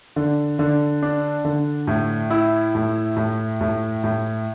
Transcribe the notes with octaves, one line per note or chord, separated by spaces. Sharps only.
D3
D3
D4
D3
A2
E4
A2
A2
A2
A2